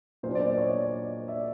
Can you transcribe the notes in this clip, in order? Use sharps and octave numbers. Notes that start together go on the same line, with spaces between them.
A#2 F#3 B3 D4 C5
C5 D5
C5 D5
C#5 D#5
D5 E5